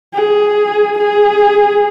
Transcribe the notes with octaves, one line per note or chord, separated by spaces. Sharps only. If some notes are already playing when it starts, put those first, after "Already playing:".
G#4
G#4